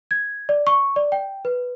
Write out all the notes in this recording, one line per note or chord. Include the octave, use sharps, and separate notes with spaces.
G#6
D5
C#6
D5
G5
B4